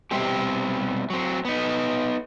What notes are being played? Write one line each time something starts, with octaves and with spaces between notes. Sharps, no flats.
B2 G3 C4 G4
F#3 C4
B3 D#4